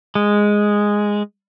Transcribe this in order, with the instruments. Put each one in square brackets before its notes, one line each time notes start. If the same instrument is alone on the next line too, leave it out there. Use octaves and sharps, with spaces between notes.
[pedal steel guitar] G#3